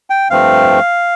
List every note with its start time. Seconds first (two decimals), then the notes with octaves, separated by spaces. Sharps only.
0.10 G5
0.30 G2 F3 A3 C4 F5